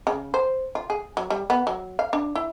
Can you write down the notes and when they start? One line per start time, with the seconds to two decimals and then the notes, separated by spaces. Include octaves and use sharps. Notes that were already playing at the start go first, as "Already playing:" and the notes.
0.07 C#3
0.34 C5
0.75 F4
0.90 G#4
1.17 F#3
1.30 G3
1.50 B3
1.67 F#3
1.99 F5
2.13 D4
2.35 E4